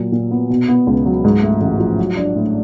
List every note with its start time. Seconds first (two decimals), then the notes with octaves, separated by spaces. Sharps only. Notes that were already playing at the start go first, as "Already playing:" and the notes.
Already playing: A#2 F#3
0.12 A#2
0.31 B3
0.50 B2
0.68 B3
0.87 C#2
1.05 F#3
1.24 G#2
1.43 A3
1.61 A1
1.80 F3
1.98 F#3
2.17 D4
2.36 A2